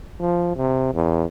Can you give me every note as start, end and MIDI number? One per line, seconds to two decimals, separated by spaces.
0.20 0.53 53
0.56 0.94 48
0.94 1.24 40